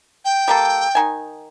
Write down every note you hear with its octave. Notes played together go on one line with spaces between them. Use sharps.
G5
G3 A#3 A4
D#3 G#5